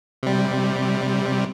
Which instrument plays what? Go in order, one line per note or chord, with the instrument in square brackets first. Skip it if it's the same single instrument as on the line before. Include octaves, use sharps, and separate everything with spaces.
[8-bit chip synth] C3 G3